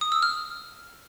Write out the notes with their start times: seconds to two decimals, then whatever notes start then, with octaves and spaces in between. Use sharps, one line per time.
0.01 D#6
0.12 E6
0.22 F6